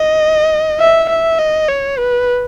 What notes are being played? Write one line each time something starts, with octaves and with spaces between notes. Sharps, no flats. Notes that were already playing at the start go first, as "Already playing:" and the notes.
Already playing: D#5
E5
E5
D#5
C#5
B4